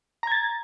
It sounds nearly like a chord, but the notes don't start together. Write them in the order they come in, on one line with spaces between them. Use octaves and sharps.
A#5 G#6 A6